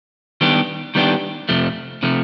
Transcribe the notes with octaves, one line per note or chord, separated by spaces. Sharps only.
D#3 G3 B3 D4 G4
D#3 G3 B3 D4 G4
F2 C3 F3 A3
C3 F3 A3